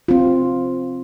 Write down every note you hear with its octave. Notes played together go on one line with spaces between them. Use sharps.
C4 F4